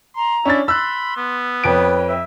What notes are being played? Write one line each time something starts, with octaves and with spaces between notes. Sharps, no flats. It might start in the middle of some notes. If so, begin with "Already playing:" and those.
A#5 C6
C#4 D4 E4 A6
B5 C6 E6 F#6
B3
F2 B4 C#5 G5 D7
E5